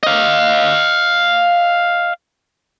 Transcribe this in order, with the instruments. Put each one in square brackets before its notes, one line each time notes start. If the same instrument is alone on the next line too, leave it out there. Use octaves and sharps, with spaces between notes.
[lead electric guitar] D#5 F5